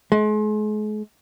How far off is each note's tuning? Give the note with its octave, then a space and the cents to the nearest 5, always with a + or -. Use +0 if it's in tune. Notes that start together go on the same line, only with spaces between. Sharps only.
G#3 +40